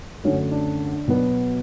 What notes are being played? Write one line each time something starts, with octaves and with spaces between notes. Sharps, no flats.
F#2 D3 F#3 A3 C#4 C#5
D4 D5
B2 F#3 B3